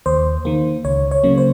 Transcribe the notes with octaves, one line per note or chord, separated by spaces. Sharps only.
D#2 C5
D#3 A#3
C#2 C#5
C#5
C#3 F#3 A#3
C5